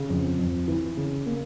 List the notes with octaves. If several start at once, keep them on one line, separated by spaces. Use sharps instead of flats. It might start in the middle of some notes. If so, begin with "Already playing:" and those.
Already playing: C#3
F2
F2
E3
C#3
A#3